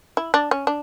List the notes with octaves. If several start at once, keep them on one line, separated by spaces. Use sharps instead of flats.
E4
D4
C#4
D4